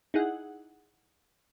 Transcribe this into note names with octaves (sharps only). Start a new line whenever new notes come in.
D#4 E4 G#4 F#5